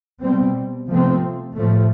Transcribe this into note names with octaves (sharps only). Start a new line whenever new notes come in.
B2 G3 C4
C3 F3 A3 C4
A2 F3 A3